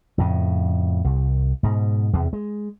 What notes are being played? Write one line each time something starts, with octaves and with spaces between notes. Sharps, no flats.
F2 A2 C#3
C2
G#2 B2
E2 C3
G#3